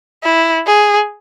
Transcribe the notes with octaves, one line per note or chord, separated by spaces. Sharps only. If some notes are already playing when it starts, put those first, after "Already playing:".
E4
G#4